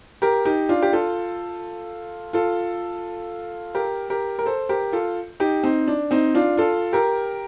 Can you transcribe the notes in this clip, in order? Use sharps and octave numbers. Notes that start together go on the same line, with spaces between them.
G4 A#4
D#4 G4
D4 F4
G4
F4 A4
F4 A4
G4 A#4
G4 A#4
A#4
A4 C5
G4 A#4
F4 A4
D#4 G4
C4 D#4
D4
C4 D#4
D4 F4
F4 A4
G4 A#4